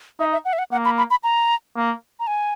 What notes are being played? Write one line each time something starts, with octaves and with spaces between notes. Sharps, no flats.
D#4 E5
E5
F#5
E5
F#5
A#3 F#5
B5
B5
B5
A#5
A#3
A#5
G#5